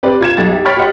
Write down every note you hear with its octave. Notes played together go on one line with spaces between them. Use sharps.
C4 G4 B4 D5
F4 G#6 E7
B1 G3 A6
G4 E5
C#5 G5 B5 F6 A6 B6
F#4 G4 D#5 F#5 C6